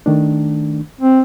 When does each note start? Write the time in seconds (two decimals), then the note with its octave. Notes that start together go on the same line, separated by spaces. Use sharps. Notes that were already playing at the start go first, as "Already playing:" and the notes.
0.06 D#3 A3 D4
1.01 C4